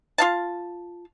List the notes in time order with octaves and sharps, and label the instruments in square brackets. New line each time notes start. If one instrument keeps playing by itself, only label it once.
[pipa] F4 F5 A5